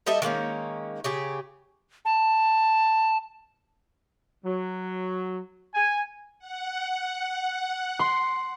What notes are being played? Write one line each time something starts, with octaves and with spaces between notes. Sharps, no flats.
G3 A4 D#5 E5
D#3 G#3 A#3 C#4
C#3 G4 G#4
A5
F#3
G#5
F#5
C6